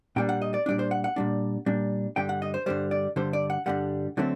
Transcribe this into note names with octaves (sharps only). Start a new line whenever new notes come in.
A#2 G3 D4 G5
F#5
D#5
D5
A#2 G3 D4 D5
C5
F#5
F#5
A#2 G3 D4
A#2 G3 D4
G2 D3 G3 G5
F#5
D#5
C5
G2 D3 G3 C5
D5
G2 D3 G3 C5
D5
F#5
G2 D3 G3 F#5
D3 F#3 A3 C4